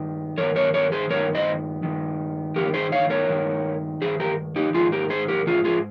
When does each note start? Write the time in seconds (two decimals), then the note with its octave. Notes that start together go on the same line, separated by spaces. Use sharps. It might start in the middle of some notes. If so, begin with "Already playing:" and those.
Already playing: G2 D#3
0.37 G2 D#3 A#4 C#5
0.56 A#4 C#5
0.74 A#4 C#5
0.92 G#4 C5
1.10 G2 D#3 A#4 C#5
1.35 C5 D#5
1.83 G2 D#3
2.56 G2 D#3 G4 A#4
2.74 G#4 C5
2.92 C#5 F5
3.10 A#4 C#5
3.29 G2 D#3
4.02 G2 D#3 G#4 C5
4.20 G4 A#4
4.56 D#4 G4
4.74 G#2 D#3 F4 G#4
4.92 G4 A#4
5.10 G#4 C5
5.28 G4 A#4
5.47 G#2 D#3 F4 G#4
5.65 F4 G#4